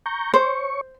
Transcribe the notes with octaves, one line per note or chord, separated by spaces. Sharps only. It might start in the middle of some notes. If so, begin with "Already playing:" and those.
A#5 C#6 G6
C5 C#5 C#6